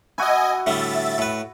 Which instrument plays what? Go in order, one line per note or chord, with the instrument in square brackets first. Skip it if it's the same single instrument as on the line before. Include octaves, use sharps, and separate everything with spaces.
[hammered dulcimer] E4 F#4 [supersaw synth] D#5 G#5
[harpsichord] A2 D3 G3 [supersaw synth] E5 A6
[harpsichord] A2 B4